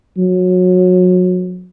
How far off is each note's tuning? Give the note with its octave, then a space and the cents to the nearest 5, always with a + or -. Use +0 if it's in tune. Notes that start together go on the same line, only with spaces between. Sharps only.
F#3 -25